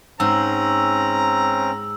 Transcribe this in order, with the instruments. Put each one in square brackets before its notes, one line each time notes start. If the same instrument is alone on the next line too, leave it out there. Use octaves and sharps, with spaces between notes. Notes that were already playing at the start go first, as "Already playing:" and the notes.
[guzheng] G#2 [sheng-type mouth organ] C4 C#4 [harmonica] A#5 [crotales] E6